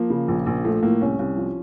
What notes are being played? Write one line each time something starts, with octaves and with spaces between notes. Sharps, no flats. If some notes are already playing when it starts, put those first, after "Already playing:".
Already playing: F3 A#3
C#3
A#1
A#1
F3 A3
A2 A#3
C2 C#4
C2
F3